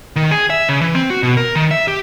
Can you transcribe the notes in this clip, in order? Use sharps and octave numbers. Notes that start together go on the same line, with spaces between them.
D#3
G#4
E5
C#3
E3
C4
F#4
B2
A#4
D#3
E5
G4